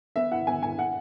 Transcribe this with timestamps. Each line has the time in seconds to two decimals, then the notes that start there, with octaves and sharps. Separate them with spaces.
0.16 B3 E5
0.31 E4 F#5
0.47 B3 G#5
0.62 E4 G#5
0.78 E4 F#5